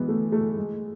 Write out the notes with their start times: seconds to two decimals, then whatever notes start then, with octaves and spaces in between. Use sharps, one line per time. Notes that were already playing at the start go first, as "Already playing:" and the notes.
Already playing: E3 G#3 B3
0.08 A3
0.32 A3
0.57 G#3